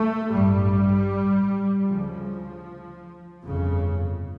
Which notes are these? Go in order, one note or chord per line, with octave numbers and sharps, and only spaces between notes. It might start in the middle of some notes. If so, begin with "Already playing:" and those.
Already playing: A3
A1 G2 G3
D2 C#3 F3
G1 F2 C#3